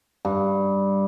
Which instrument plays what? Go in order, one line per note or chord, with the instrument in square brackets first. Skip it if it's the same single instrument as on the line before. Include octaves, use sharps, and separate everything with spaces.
[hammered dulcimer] G2